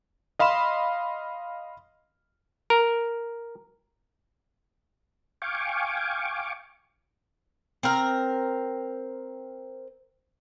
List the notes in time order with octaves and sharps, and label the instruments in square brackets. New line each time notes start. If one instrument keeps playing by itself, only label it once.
[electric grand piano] D#5 F5 B5 C6 E7
[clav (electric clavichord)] A#4
[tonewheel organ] F5 G5 G#5 C#6 D6
[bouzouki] C4 A#4